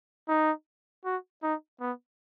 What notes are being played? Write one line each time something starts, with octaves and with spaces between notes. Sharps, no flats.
D#4
F#4
D#4
B3